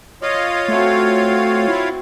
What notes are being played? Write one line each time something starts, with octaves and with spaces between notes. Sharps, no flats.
F4 C#5 D#5 F5
A3 C4 F#4
E4